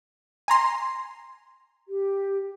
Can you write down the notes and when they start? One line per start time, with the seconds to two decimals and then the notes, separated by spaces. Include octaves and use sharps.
0.48 G#5 A#5 C6
1.88 G4